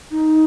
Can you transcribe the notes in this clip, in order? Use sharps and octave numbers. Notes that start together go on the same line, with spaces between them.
D#4